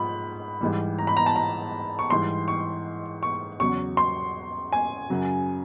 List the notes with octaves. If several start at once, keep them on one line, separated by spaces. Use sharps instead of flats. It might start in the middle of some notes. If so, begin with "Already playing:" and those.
Already playing: G#2 F3 B5
G#2 E3 G3
A#5
B5
A#5
A5
A#5
C#6
G#2 E3 G3 C6
C#6
C#6
E2 C#3 F#3 C#6
C6
G#5
F#2 C#3 F#3